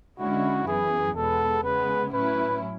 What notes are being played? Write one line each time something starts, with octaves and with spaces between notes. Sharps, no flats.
D3 G#3 C#4 E4 F#4
F#2 E3 B3 G#4
E2 B2 G#3 B3 A4
C#3 G#3 B3 B4
A2 F#3 C#4 E4 B4